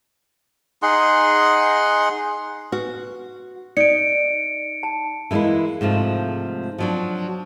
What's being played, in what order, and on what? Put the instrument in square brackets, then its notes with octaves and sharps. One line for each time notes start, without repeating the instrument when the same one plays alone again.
[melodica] D#4 G#4 F#5 C6
[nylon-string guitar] F#4 [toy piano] B4
[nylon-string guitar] D#4 [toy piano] D5 [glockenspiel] C#7 D7
[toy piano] A5
[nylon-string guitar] E3 G3 G#3 A#3 E4
G#2 C3 F3 A3
F3 F#3 D4